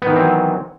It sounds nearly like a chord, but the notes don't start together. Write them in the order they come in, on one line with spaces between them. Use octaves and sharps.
B3 D#3 E3 C4 F#3